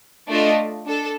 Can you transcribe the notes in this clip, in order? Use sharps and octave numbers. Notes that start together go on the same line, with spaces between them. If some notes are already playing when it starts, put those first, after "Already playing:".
A3 D4 F4 A4 D#5
D4 A4